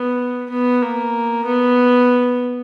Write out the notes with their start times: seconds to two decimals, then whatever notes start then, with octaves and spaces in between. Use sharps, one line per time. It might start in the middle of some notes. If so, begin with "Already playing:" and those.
Already playing: B3
0.50 B3
0.82 A#3
1.45 B3